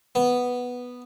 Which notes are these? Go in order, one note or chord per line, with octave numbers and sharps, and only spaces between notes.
B3